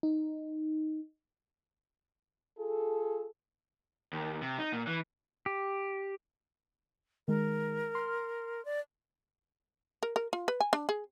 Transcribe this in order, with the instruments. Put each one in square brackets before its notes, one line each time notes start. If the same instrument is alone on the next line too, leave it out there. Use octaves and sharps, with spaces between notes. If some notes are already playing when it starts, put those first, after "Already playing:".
[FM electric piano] D#4
[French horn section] F4 G#4 A4
[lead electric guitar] D#2
C3
D#4
A#2
E3
[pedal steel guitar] G4
[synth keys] D#3 G#3 [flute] A#4
[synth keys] C6 F6
[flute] D5
[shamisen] A#4
A#4
F4
B4
G#5
D4
G#4